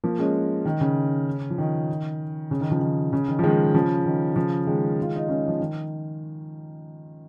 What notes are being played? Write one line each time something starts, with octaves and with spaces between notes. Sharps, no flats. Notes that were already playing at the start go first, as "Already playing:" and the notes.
F3 A#3
G#3 C#4
D#3
C#3
F3
D#3
C#3
D#3
C#3 F3
D#3
C#3
D#3
F3
D#3 G#3
C#3 F3
D#3
C#3 F3
D#3 G#3
F4
D#4
G#3 C#4
F3
D#3